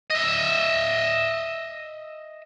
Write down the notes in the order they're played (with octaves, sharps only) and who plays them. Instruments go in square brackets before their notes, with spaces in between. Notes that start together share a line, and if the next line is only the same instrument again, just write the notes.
[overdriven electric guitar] D#5 E5